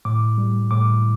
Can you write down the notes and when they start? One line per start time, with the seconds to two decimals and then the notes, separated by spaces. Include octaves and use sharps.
0.05 A2 D6
0.38 G3
0.71 A2 D6